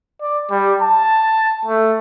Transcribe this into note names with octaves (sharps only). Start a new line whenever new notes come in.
D5
G3
A5
A3